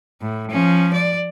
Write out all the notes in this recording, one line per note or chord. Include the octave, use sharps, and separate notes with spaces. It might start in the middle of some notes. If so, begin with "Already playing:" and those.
A2
F3 C#4
D5